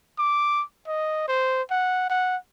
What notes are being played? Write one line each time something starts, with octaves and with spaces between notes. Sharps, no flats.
D6
D#5
C5
F#5
F#5